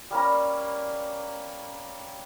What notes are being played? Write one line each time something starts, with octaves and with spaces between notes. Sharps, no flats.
G3 A#3 C#4 A#5